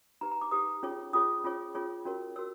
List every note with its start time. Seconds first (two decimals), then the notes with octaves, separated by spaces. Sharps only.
0.21 D#4 G4 B4 A#5
0.32 A#5
0.41 D6
0.51 D#4 G4 B4 D#6
0.83 C#4 F4 G#4 C#5
1.13 C#4 F4 G#4 C#5 D#6
1.44 C#4 F4 G#4 C#5
1.75 C#4 F4 G#4 C#5
2.05 C#4 F#4 A#4 C#5
2.36 F#4 A#4 C#5 E6